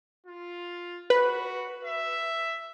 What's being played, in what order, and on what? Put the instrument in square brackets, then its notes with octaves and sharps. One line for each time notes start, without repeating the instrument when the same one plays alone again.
[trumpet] F4
[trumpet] F#4 [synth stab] B4
[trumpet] E5